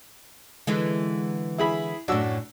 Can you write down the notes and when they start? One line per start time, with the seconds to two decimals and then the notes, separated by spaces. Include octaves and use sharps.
0.67 D3 E3 G#3
1.58 E4 G#4 B5
2.08 F#2 A2 D4 F#4 E6